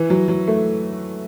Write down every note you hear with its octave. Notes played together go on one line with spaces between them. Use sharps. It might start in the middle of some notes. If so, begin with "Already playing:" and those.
Already playing: E3
F#3
F#3
A3